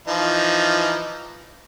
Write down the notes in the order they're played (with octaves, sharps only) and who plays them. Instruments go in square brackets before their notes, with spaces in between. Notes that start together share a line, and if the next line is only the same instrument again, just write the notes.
[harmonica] E3 F3 D#4